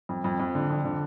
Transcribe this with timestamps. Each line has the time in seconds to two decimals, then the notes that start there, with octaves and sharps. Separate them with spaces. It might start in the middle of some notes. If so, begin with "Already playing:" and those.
0.09 F2
0.24 F2
0.40 F2
0.55 D3
0.70 F2
0.85 D3